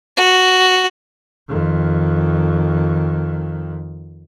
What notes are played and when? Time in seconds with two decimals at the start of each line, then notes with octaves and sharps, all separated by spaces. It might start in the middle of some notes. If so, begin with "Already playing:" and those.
0.17 F#4
1.48 F2 D#3